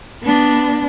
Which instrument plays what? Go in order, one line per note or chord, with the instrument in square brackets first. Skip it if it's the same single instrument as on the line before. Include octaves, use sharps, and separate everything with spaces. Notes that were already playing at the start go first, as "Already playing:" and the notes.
[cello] B3 D4